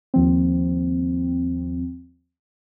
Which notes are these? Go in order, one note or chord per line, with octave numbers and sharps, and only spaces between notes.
D#2 F3 C4